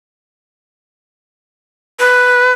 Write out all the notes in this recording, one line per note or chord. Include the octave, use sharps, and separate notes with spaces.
B4